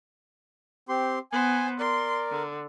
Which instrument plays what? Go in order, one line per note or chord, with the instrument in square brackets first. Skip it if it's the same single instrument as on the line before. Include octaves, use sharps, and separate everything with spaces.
[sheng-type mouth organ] C4 G4 C6
[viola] B3 C5 [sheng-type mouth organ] G#5
[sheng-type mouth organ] A#4 D5 [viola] C6
[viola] D3